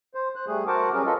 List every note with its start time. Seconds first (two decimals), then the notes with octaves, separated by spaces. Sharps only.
0.15 C5
0.36 C5 F#6
0.47 G3 A3 G#4
0.67 F#4 A#4 C5 F#5 A5 D6
0.94 F#3 G3 C#4 G#4 A#4
1.06 F4 A4 B4 D#5